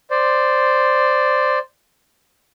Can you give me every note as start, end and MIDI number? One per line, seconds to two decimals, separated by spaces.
0.11 1.59 72
0.11 1.59 74